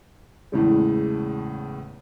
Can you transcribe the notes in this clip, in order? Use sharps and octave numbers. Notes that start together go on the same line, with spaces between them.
E2 A2 C#3 G#3